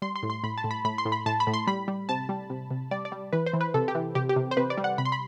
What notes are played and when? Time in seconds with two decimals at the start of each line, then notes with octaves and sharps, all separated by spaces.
0.02 G3 C6
0.16 C6
0.23 A2
0.30 C6
0.44 A2 B5
0.58 A5
0.64 A2
0.71 B5
0.85 A2 B5
0.98 C6
1.05 A2
1.12 B5
1.26 A2 A5
1.40 B5
1.47 A2
1.54 C6
1.67 G3 B5
1.88 G3
2.09 C3 A5
2.29 G3
2.50 C3
2.71 C3
2.91 G3 D5
3.05 D5
3.12 G3
3.33 E3 B4
3.46 C5
3.53 E3
3.61 B4
3.74 C3 A4
3.88 G4
3.95 E3
4.15 C3 G4
4.29 G4
4.36 C3
4.51 C5
4.57 C3 B4
4.70 D5
4.78 G3
4.84 F#5
4.98 C3 B5
5.05 C6
5.12 B5